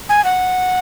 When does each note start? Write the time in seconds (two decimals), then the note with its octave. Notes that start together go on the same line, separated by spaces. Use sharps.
0.09 G#5
0.25 F#5